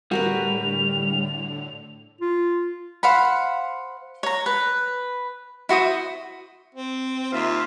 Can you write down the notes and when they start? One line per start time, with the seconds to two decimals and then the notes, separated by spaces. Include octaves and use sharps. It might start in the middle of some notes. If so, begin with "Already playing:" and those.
0.11 A2 D3 G3 F#4 A#4 B4 F7
2.21 F4
3.03 C5 F5 F#5 B5
4.23 C#5 A#5
4.46 B4
5.69 E4 F#4 C5 D#6
6.74 C4
7.33 D#2 F4 E5